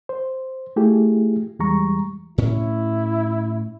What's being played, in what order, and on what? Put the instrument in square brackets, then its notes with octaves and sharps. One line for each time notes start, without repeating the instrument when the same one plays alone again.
[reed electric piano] C5
A3 E4 F4 G4 G#4
E2 E3 G3 G#3 A#5 C#6
[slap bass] A2 C#4 [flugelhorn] E4